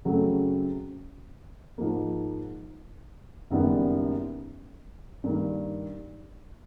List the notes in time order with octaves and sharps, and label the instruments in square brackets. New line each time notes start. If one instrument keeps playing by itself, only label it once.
[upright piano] F#2 C#3 F#3 A3 C4
G#2 F3 A#3
F#1 F#2 D#3 G3 B3
G2 D#3 G3 A#3